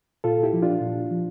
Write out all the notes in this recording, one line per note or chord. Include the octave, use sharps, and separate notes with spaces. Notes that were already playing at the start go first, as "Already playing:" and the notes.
A#2 F4 A4
E4 G4
F3
D4 F4
A#2
F3